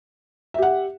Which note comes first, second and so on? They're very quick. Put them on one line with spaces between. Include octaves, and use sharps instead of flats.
E5 G4 F#5